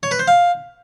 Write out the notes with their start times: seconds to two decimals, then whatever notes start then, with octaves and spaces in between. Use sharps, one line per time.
0.03 C#5
0.11 B4
0.19 C5
0.28 F5